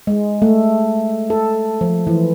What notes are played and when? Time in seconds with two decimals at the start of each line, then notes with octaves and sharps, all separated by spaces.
0.07 G#3
0.42 A3
1.30 A4
1.81 F3
2.07 E3